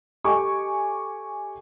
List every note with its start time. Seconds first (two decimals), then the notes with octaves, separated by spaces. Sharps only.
0.24 G4 A4 D#5 G#5 C#6 D6